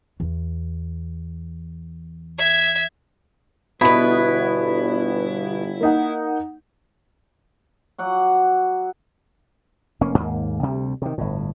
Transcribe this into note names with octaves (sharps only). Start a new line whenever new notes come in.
E2
E5 G#6
G1 B2 B3 E4 B4 B5 D#6
A#3 D#4 F#5
F#3 F#5 D6
F1 A#3 C#4
D#2 G#2 A3 A#3
D2 C3 G3
C3 D#3
G1 A2